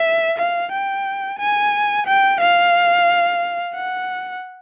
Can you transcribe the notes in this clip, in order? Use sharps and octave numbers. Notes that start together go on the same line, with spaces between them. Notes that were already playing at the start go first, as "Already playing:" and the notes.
Already playing: E5
F5
G5
G#5
G5
F5
F#5